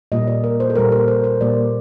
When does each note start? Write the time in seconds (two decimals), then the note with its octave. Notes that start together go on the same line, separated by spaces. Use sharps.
0.12 A#2 G3 A#3 D#5
0.28 D5
0.44 A#4
0.60 C5
0.70 A4
0.75 A#2 G3 A#3 A#4
0.92 A#4
1.08 C5
1.24 C5
1.40 A#2 G3 A#3 D5